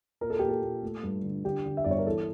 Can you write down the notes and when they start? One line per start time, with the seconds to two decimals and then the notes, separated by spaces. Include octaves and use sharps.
0.21 A#2 A#4
0.30 A4
0.39 A#2 G4
0.48 A4
0.63 A#2
0.82 A3
1.03 G2
1.23 D3
1.44 D3 G4
1.66 D3
1.77 E5
1.84 G1 D5
1.91 C#5
1.99 A#4
2.06 E3 A4